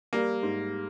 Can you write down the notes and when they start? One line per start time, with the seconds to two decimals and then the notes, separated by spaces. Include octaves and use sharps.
0.13 G3 A#3
0.43 G#2